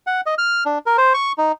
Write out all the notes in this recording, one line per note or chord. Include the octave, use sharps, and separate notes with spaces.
F#5
D#5
F6
D4
A#4
C5
C#6
D#4